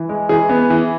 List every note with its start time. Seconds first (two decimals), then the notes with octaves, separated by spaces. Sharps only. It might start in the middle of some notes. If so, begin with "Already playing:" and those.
Already playing: E3
0.09 G#3
0.29 E3 G#4
0.49 B3
0.70 E3